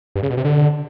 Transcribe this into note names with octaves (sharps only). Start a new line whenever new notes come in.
G2
C#3
B2
C3
D3